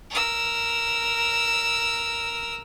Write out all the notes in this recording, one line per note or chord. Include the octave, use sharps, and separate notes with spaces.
A#4 E6